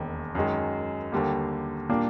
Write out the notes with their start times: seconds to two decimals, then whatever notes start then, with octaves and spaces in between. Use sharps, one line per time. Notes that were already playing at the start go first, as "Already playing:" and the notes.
Already playing: E1 D#2 D#3
0.35 F#2 D#3 G#3
1.12 D#2 D3 G3 A#3
1.89 A#2 G3 A#3 D4